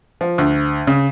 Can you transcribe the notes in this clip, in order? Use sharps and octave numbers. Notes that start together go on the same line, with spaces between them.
F3
D2
C#3